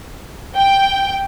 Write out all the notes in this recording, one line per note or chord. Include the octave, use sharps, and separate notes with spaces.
G5